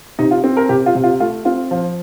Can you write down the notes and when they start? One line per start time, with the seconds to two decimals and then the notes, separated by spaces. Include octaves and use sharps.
0.19 C3 D#4
0.31 F4
0.44 C4
0.57 A#4
0.69 C3 G4
0.86 F4
0.95 C3
1.04 F4
1.20 A3 F4
1.45 C4 F4
1.71 F3